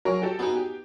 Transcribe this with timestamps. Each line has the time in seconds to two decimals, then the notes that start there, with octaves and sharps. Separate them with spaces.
0.05 F#3 G#4 A#4
0.22 G4 A4
0.39 B3 D#4 F#4 G#4
0.56 G4